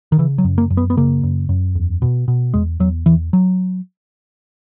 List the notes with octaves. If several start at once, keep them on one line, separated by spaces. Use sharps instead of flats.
D#3
C#3 E3
F#3
F#2
A#3
F#2
B3
B3
C#3 A#3
F#2
F#2
E2
B2
B2
E2 G#3
E2 F#3
E2 E3
F#3